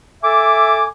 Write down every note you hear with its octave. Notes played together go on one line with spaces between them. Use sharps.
A4 E5 G#5 D6